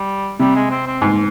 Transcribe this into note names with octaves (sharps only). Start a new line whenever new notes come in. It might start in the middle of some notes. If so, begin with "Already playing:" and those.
Already playing: G3
C3 G3
G#3
C4
C4
G#2